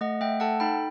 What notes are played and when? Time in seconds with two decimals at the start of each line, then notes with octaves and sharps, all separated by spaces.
0.01 A3 D#5 F#5
0.21 A3 E5 G5
0.40 A4 F#5 A5
0.60 D#4 G5 B5